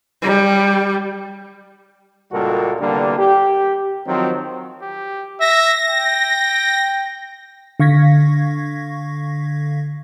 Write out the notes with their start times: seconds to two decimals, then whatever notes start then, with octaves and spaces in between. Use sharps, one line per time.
0.22 G3
2.32 C#2 A#2 G3 F#4 A4 A#4
2.80 C2 D3 G3 A#3 B3 D4
3.18 G4
4.07 D#3 F3 F#3 C4
4.82 G4
5.40 E5 A#6
5.89 G5
7.80 D3 F5 C#6 G#6 A#6 B6